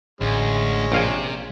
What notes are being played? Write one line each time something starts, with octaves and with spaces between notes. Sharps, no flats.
A1 D2 G#3 C#4
A#1 C3 F5 G#5